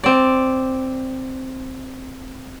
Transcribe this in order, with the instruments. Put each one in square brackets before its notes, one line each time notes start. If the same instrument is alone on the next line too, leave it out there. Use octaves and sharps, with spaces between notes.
[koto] C4 D5